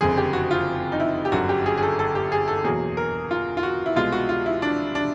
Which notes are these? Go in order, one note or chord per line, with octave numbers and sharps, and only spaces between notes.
F#1 F2 D3 G#4
G4
F#4
F4
D#4
E4
G4
G1 F#2 D3 F#3 F#4
G4
G#4
G#4
A4
A4
G4
G#4
A4
E2 B2 F#3 A#3 G#4
A#4
F4
F4
F#4
E4
C2 B2 G#3 F4
F#4
F4
E4
D4
D4